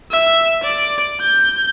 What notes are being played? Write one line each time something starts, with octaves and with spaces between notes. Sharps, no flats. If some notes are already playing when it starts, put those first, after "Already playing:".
E5
D5
G6